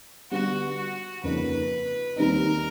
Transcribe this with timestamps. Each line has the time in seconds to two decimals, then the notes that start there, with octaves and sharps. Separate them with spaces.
0.31 D3 G3 B3 F#4
0.77 F#4
1.23 F2 C#3 F3 A#3 D#4 B4
2.16 D#2 D#3 G3 C4 D#4 A#4